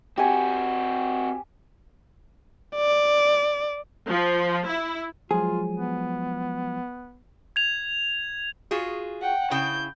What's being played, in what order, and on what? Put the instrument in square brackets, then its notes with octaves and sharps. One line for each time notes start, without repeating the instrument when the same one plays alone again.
[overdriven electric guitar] C4 F#4 [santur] G4 G#5
[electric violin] D5
[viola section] F3
E4
[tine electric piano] F3 F#3 G#3 [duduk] F4 [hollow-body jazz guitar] G#4
[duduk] B3
[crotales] G#6 F7
[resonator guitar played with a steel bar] F4 F#4 G#4
[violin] F#5 G5
[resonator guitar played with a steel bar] C#3 E4 G5 [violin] G6